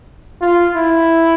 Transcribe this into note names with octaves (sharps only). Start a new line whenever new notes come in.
F4
E4